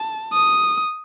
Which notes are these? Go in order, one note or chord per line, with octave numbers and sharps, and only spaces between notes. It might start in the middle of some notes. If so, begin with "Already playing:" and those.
Already playing: A5
D#6